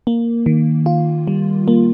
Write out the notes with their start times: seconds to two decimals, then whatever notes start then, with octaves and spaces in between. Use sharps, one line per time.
0.07 A#3
0.46 D#3
0.86 F4
1.28 G3
1.68 A#3